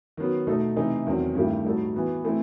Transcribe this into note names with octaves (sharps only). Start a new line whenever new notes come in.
D#3 F#3 B3
B2 A3 D#4 A4
C3 E3 A3 D#4
E2 D#3 F#3 C4
G2 D#3 A3 E4 G4
A2 G3 D#4 F#4 A4
E3 B3 F#4
E3 A3 C4 E4